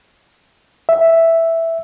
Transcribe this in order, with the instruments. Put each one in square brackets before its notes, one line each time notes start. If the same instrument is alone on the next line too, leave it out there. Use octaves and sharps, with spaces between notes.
[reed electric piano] E5